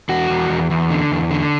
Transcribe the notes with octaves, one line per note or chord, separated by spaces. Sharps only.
E2 F#4
E2
E2
E2
D3
E2
D3